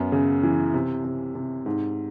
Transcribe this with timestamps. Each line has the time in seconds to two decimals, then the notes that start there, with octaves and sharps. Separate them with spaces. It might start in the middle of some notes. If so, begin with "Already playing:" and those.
Already playing: F#2 B3
0.12 C#3
0.43 E3
0.74 C3
1.05 C3
1.35 C3
1.66 G#2